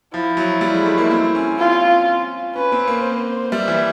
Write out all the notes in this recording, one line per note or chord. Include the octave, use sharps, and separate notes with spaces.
F3 E4
F#3
G3
G#3
A3
A#3
C4
C#4
F4
C#4 B4
C4
A#3
C5
G3 E5
E3